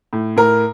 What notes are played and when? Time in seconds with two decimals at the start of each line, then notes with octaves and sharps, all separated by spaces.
0.13 A2
0.36 A2 A#4